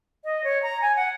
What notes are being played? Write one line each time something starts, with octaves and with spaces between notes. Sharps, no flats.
D#5
C#5
A#5
G#5
F#5